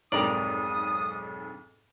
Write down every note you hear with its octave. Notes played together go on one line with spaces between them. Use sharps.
B1 F2 G#2 G4 A#4 D5 D#6